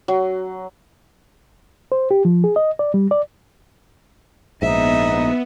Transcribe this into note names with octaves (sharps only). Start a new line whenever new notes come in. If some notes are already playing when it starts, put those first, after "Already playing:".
F#3
C5
G4
F3
G#4
D#5
D5
G3
D5
A#1 G#2 B3 D#4 E5